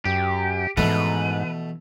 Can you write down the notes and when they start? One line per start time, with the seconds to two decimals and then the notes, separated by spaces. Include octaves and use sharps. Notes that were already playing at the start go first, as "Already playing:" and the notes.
0.05 F#2 G4
0.77 G#2 B2 E3 F3 A3 B4